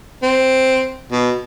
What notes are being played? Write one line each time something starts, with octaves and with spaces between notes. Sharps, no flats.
C4
B2